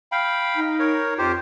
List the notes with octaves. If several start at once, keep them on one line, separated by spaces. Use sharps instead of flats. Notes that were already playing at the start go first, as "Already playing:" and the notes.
F5 G5 B5
D#4
A#4 C#5
F2 F4 G4 C5